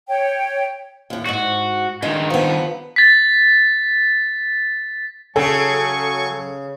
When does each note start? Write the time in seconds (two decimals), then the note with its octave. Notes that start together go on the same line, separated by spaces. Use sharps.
0.09 C#5 G5
1.10 D#2 A2
1.26 D2 G#2 F#4
2.02 G2 D#3 G#3
2.30 F3 B3
2.96 A6 B6
5.36 C#3 F#3 A4 G#5 C#6